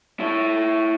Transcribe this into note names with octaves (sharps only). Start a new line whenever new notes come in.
E4 C#5